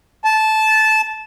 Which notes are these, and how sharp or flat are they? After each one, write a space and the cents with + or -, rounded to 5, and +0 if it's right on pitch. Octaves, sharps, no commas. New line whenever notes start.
A5 -15